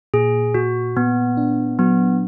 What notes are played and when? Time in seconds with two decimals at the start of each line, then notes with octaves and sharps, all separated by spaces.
0.14 A#2 G#4
0.54 A#2 F#4
0.97 A#2 B3
1.37 D4
1.79 F#3 B3